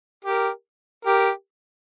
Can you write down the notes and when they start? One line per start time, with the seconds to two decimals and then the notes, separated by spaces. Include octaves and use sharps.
0.24 G4 A#4
1.05 G4 A#4